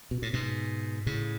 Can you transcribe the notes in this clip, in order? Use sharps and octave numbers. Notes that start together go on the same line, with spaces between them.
B2
A2
G#2 B2
A2 C#3